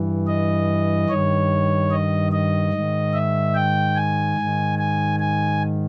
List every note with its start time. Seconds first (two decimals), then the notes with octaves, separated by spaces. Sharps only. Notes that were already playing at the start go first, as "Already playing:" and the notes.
Already playing: G2 E3
0.27 D#5
1.09 G2 D#3 C#5
1.91 D#5
2.32 D#5
2.73 G#2 D#3
3.14 E5
3.55 G5
3.96 G#5
4.37 G#2 D#3
4.79 G#5
5.19 G#5